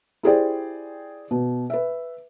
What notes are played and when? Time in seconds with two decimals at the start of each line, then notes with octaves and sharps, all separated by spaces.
0.23 E4 G4 G#4 C5 D5 G5
1.31 B2
1.70 B4 E5